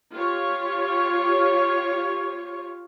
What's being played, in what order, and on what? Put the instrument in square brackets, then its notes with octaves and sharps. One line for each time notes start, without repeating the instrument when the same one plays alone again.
[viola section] F4 G4 C#5